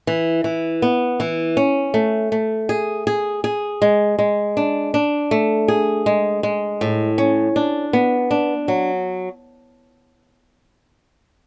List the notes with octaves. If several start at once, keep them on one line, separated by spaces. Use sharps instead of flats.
E3
E3
B3
E3
C#4
A3
A3
G#4
G#4
G#4
G#3
G#3
D4
D4
A3
G#4
G#3
G#3
A2
C#4
D4
B3
D4
F#3